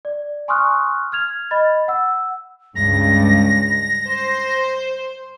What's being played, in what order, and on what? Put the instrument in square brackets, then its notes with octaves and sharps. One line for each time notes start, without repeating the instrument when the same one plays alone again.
[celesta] D5
G#5 C6 C#6 D#6 F6 F#6
F6 G#6 F7
D#5 B5 A6
F#5 E6
[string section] C#2 G2 [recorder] A#6
[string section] C5